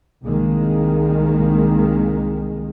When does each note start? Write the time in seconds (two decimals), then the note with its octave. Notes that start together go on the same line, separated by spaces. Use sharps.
0.22 C2 D#3 G#3 A#3